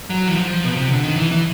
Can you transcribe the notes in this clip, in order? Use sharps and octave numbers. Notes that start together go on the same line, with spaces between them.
F#3
E3
F3
B2
C3
D3
D#3
E3
E3